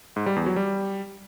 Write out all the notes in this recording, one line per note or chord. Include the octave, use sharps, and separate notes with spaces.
G#2
G3
E2
F#3
G3